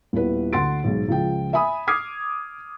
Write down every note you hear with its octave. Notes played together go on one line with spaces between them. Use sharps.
D#1 B3 E4 B4
D2 F#5 C6 A6 D7
B1 G#2
C#2 F3 G5
E5 G#5 B5 D#6
D6 D#6 F6 G#6 C7